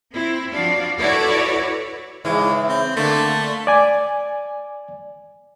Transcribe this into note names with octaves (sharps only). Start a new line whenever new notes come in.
C4 E4
F3 D4 F#4 D5 F5
E4 F#4 A4 B4 C#5 D5
G#2 C#3 E3 G#3
C4
D3 A3 A#3
D5 G#5